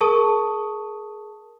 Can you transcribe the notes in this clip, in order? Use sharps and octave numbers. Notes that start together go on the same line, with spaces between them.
G#4 A#4 A5 C#6 D#6